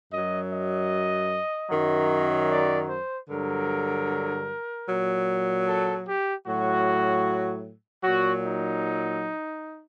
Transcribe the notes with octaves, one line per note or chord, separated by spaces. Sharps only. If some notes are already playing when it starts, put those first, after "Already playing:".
F#2 F#3 D#5
D#5
F#2 D#3 F#3
D5
C5
G2 D3 F#3 A#4
A#2 F#3
A4
G4
A2 F#3 F#4
A#2 F#3 F#4
D#4